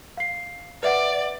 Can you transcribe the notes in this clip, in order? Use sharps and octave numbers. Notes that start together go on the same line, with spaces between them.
F5 C7
B4 D5 E5 F#5